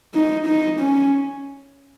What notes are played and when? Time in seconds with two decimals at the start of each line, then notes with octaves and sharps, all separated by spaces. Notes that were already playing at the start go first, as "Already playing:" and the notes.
0.14 D#4
0.47 D#4
0.80 C#4